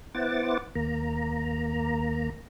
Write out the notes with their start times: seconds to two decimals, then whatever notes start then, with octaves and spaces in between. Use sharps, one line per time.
0.15 B3 E4 C5 F#5 D6 A6
0.75 D#2 A#3 A#5